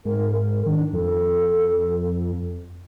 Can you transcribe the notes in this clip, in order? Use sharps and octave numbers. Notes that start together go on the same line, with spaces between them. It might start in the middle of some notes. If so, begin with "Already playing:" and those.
G#2 A#4
A#4
D#3 D4
F2 A4